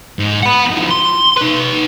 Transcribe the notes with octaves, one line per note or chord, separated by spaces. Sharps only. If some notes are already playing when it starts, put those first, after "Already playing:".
G#2
F#5 B5
D#3 F3
C6
D#4 B4